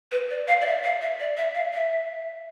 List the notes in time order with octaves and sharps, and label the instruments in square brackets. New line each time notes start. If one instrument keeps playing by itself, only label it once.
[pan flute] B4
D5
F5
D5
E5
F5
E5
D5
E5
F5
E5